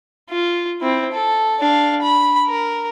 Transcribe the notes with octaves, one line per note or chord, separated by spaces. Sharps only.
F4
C4 E4
A4
D4 F5
B5
A#4